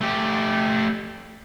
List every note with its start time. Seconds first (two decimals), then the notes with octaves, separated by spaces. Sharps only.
0.01 A3 G4